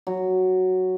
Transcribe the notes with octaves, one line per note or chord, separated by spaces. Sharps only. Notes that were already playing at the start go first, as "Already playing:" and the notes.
F#3